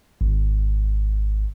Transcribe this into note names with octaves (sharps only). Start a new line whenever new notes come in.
G#1